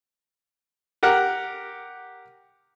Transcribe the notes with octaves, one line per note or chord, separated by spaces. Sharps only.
G4 A#4 F#5